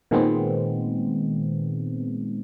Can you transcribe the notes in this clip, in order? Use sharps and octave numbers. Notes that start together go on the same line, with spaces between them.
A#2 D#3 G#3 B3 C4